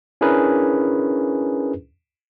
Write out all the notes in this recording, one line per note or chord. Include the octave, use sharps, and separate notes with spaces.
C#4 D4 E4 G#4 A#4 B4